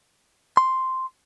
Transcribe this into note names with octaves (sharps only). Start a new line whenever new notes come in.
C6